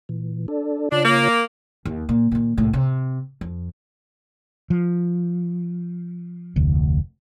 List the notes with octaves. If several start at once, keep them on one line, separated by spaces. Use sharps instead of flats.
A#2 E3
D4 A4 D5
C#3 D4 F4 C#5
A#3
D#2
A#2
A#2 D#3
C2 A2
C3
F2
F3
F1 D2